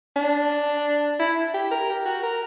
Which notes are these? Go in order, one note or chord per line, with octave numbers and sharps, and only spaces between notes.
D4
E4
G4
A#4
G4
F#4
A#4